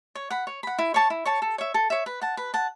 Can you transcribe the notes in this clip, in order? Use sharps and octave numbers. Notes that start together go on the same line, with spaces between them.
C#5
F#5 B5
C#5
F#5 B5
E4
C#5 A5 C#6
E4
C#5 A5 C#6
A4
C#5 E5
A4
C#5 E5
B4
F#5 A5
B4
F#5 A5